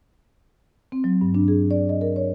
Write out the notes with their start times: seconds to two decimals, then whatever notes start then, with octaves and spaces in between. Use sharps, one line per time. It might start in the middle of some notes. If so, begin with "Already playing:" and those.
0.92 C4
1.04 F#3
1.21 G2
1.35 D4
1.48 G#4
1.71 D5
1.89 D#5
2.01 A#4
2.16 C#5